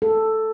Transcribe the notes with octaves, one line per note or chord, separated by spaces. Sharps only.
A4